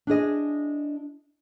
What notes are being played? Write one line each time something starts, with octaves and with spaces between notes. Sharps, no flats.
D4 E4 G#4 D#5